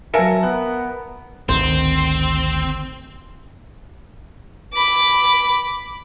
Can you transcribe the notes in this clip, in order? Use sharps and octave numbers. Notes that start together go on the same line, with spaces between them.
F#3 A#4 B4 E5 F5 G#5 A5 C#7
B3 F#6
G#1 D2 D#3 C4 C5
B5 D6